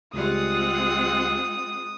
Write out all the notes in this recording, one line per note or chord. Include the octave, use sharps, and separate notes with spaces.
C#2 G3 G#3 C4 F4 G#4 F#5 D#6